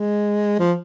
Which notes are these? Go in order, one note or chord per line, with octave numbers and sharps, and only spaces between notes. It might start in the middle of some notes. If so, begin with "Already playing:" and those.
Already playing: G#3
F3